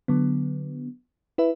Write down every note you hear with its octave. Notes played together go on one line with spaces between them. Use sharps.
D3 F#3 B3
E4 B4 E5